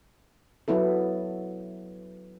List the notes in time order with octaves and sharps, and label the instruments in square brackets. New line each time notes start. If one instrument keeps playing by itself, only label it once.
[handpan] F#3 B3 E4 A4